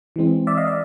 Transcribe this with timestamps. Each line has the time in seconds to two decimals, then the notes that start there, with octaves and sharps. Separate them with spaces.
0.16 E3 G#3 C4
0.47 D5 E5
0.57 D#5 F5
0.67 D5 E5